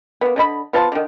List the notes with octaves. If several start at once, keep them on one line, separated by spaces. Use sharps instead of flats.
A#3 B3
D3 D#5 B5
B3 F4 C5 A5
D3 D#3